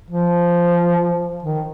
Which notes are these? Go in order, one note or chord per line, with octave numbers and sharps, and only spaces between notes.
F3
D#3